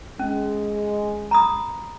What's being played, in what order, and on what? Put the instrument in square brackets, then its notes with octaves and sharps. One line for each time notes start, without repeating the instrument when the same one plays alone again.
[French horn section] G#3 [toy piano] C#4
[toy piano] A#5 B5 D#6